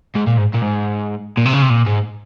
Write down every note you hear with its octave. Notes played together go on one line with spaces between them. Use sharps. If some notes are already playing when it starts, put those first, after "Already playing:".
G#2
A#2
G#2
A#2
G#2
A#2
C3
C#3
C3
A#2
G#2